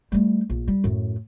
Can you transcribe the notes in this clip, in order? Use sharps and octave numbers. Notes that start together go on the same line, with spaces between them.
G3 A3
A#1
G3
F#2 A2